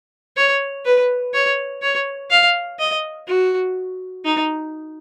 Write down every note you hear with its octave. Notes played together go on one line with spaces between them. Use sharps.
C#5
B4
C#5
C#5
F5
D#5
F#4
D#4